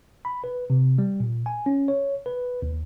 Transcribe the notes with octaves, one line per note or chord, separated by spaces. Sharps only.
B5
B4
C3
G3
A#2
G#5
C#4
C#5
B4
D#2